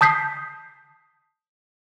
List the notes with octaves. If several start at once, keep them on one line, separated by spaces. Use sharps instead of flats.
A5 D#6 G6 B6 C7